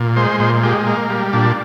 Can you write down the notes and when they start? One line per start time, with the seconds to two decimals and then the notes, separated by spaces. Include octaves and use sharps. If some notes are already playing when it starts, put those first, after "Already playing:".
Already playing: A#2
0.16 G#3 C5
0.40 A#2 C5
0.63 G#3 G4
0.86 A#3
1.10 G3
1.33 A#2 D4